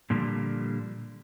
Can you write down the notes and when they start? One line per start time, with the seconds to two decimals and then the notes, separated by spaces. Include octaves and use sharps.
0.10 A#2 D3 F3 G3